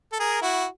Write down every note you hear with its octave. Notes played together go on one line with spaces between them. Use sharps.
A4
G#4 A#4
E4 F#4